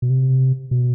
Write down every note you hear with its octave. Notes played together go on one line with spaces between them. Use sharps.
B2
C3
B2